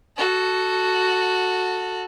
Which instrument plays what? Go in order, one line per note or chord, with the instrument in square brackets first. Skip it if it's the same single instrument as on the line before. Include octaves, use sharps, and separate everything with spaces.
[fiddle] F#4 A4